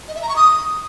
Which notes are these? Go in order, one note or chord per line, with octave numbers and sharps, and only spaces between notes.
D#5
E5
A#5
C#6
D#6